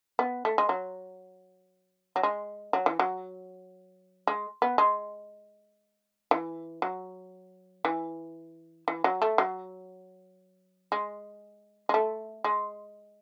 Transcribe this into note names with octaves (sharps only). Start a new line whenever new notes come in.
B3
A3
G#3
F#3
F#3
G#3
F#3
E3
F#3
G#3
B3
G#3
E3
F#3
E3
E3
F#3
A3
F#3
G#3
G#3
A3
G#3